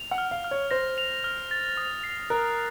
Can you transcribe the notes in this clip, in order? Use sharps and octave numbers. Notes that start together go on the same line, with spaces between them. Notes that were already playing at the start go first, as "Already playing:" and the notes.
Already playing: F7
F#5
F6
F5
F6
C#5
C5 A#6
F7
F6
A6
D#6
C7
A#4 F#6